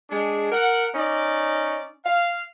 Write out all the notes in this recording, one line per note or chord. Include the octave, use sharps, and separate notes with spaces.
G#3 D4 G#4
A#4 F#5
C#4 D#4 D5
F5